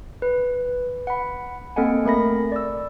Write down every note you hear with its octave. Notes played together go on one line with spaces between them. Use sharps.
B4
F#5 B5
A#3 C4 A4 D#5 F#5 G#5
A3 A#4 B5 A#6
D5 E6